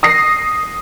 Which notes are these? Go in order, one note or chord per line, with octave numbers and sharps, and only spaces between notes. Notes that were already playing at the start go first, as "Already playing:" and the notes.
D#6 A#6 C7